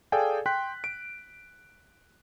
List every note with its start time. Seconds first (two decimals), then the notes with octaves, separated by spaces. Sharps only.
0.12 G#4 A4 D5 F5 G5 G#5
0.46 G5 C6 F#6 B6
0.84 D7